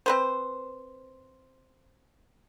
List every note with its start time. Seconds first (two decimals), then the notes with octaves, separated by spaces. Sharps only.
0.06 C4 B4 C5